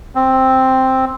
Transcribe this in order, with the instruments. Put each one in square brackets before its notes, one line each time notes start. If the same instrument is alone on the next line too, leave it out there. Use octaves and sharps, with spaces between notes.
[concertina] C4